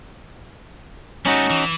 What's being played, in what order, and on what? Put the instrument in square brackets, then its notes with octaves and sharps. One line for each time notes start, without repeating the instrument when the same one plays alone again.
[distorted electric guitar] G3 A3 [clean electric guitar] C#4 D#4 F#4
[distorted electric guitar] E3